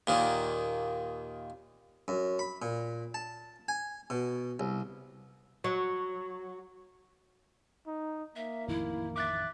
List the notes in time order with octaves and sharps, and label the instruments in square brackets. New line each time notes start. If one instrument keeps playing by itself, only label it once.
[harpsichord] D#2 A#2 D#3
F#2
B5
A#2
A5
G#5
B2
C2
[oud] F#3
[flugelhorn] D#4
[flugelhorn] A#3 [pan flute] E5
[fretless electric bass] A1 F2 D#3 [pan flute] E4
[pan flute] E5 [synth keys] D6 F#6 A6